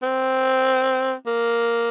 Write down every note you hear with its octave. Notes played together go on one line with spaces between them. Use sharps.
C4
A#3